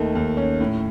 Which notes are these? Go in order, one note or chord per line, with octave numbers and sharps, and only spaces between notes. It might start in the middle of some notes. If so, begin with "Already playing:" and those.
Already playing: D#2 D#3 A3
D#2
C#4
A2